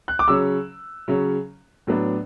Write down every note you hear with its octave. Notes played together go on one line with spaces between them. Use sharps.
F#6
D6
C#3 F#3 C#4 E6
C#3 F#3 C#4
A2 F#3 B3 D4